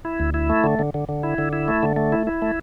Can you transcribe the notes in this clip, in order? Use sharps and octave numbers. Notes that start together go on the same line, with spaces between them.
E4
D2
E4
A3
D3
D3
D3
D3
E4
D3
E4
A3
D3
A3
E4
E4
A3